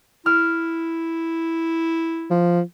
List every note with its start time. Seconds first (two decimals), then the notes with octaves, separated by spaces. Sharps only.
0.26 E4 F6
2.31 F3